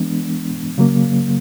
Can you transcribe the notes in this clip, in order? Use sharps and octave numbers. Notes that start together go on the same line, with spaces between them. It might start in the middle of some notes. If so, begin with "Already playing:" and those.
Already playing: E3 G#3 B3 D4
C#3 F#3 A#3